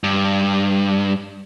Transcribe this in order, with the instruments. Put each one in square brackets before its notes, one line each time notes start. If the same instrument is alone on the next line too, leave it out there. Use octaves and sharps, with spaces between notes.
[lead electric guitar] G2